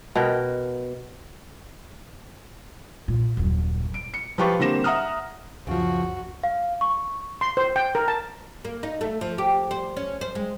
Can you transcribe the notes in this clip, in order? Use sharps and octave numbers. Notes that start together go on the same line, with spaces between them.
B2 A#4 F#5 G5
A#2
D#1 F#2
D7
C#7
F3 F4 G4 B4 C#6
D3 G3 A#3 C4 A#6 E7
E5 F#5 A#5 D#6 F6
C#2 F#2 C#3 F3 F#4
F5
C#6
C6
C5
G5
A#4
A5
A#3
D#4
A3
F3
G4
C5
C#4
C5
G#3